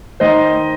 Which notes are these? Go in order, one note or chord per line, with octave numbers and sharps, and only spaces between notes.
D#3 C5 D#5